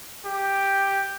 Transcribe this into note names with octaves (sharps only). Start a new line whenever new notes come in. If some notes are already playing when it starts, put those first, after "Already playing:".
G4